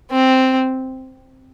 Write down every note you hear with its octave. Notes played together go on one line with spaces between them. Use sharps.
C4